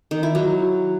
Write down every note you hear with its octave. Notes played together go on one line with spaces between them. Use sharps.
D#3
E4
F#3